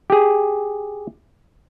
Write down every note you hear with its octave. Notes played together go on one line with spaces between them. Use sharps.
G4 G#4